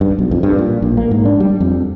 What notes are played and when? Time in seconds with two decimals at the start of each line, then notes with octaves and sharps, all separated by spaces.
0.01 G2
0.19 B1
0.31 F2
0.43 G2
0.58 A#2
0.82 A#1
0.97 A#3
1.11 G#2
1.25 D4
1.40 G3
1.60 F2